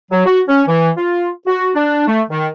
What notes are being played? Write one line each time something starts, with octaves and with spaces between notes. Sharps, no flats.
F#3
F#4
C#4
E3
F4
F#4
D4
A3
D#3